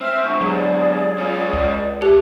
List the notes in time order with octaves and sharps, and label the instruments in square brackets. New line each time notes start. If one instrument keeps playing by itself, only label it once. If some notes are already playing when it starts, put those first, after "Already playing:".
[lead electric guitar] C4 [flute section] E5 F6
[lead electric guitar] G#2 D3 [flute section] C#6
[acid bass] F#3 [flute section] G#4 D5
[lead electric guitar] C#4 F4
[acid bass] C#2
[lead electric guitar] A3 A4 [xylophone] G4 [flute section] F#6